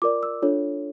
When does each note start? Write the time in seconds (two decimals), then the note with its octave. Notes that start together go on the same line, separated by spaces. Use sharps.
0.02 F4 A#4 D5 D6
0.23 E6
0.42 D4 F4 A4 C#5